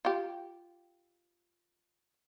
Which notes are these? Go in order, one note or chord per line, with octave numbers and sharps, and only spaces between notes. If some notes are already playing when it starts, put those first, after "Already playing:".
F4 G4